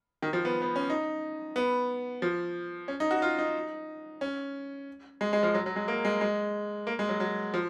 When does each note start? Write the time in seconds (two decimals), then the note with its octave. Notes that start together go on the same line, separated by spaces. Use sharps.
0.22 D#3
0.33 F3
0.45 B3
0.62 B3
0.76 C#4
0.90 D#4
1.56 B3
2.22 F3
2.88 C#4
3.00 D#4
3.11 F#4
3.22 F4
3.39 D#4
4.21 C#4
5.21 G#3
5.33 G#3
5.43 F3
5.54 F#3
5.66 F#3
5.76 G#3
5.88 A#3
6.05 G#3
6.21 G#3
6.87 A#3
6.99 G#3
7.09 F#3
7.20 F#3
7.54 F3